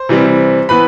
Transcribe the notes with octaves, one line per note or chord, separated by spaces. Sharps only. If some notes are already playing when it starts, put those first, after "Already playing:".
Already playing: C5
C3 E3 G3 C4
E3 B3 B4 B5